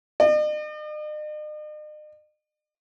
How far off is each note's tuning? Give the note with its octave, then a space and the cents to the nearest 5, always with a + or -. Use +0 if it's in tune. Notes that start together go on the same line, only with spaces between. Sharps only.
D#5 -45